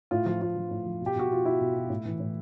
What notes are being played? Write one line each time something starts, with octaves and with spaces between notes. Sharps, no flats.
A2 F4
F3 F4
A2 F4
F3
A2
F3
B2
G4
B2 F#4
B2 F4
B2 E4
B2
B2
A2
E3
A2